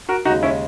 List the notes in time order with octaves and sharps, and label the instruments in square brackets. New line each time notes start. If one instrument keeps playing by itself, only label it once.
[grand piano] F#4 A#4
[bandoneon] D#2 C#3 G#3 [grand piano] D#4 F#4
[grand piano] C#4 E4